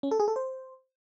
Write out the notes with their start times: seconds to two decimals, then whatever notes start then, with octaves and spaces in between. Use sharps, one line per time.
0.03 C#4
0.11 A4
0.20 G#4
0.28 A4
0.36 C5